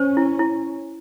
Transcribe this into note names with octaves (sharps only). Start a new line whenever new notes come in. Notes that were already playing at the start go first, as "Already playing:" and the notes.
Already playing: C#4 C5
E4
E4